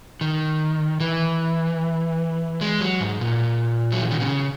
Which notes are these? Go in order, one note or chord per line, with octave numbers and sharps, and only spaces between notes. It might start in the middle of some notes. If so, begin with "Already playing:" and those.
D#3
E3
G#3
F#3
G#2
A#2
F#3
E3
D#3
C#3